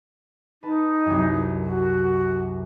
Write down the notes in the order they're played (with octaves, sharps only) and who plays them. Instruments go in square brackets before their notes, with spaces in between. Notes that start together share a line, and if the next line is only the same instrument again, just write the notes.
[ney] D#4 [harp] B4 A5
[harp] C2 F#2
[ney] F#4